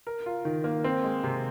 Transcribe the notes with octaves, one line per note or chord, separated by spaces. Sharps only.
A#4
F4
D#3
A#3
C4
G#3
C3